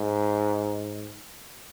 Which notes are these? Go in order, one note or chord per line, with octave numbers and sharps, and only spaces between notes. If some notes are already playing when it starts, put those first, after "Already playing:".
Already playing: G#2